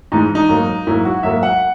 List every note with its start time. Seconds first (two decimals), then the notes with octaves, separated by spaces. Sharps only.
0.12 G#2 E3 G#3 D#4
0.35 D#4
0.49 G#2 F#3 A#3
0.87 G#2 F#3 A#3 E4
1.05 F#4
1.23 G#2 F#3 A#3 E5
1.43 F#5